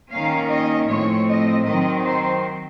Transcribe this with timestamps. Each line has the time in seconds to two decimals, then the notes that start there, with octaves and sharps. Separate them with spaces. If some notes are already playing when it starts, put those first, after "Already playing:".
0.11 D#3 A#3 C#4 F5
0.50 D#5
0.88 A2 F3 C4 C#5
1.28 D#5
1.66 D#3 F#3 C4 D#5
2.05 C5